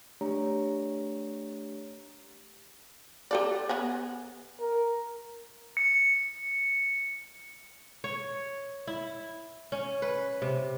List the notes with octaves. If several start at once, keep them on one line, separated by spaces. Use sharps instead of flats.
A3 D4 G4 C#5 A#5
G4 A4 D5
B3 F#5 G#5
A#4
C#7
C#5
E4
C#4
B4
C3